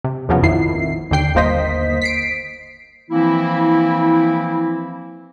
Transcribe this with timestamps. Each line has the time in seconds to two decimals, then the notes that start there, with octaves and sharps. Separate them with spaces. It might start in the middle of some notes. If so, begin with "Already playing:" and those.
0.04 C3
0.29 E2 C#3 F3 F#3 B3
0.42 A#1 F2 D#3 E4 C7
1.11 D#2 D3 G5 C7
1.35 G1 D#2 A#3 C5 D#5 B6
2.02 B6 C7 D7
3.11 E3 F3 A#3 C4 E4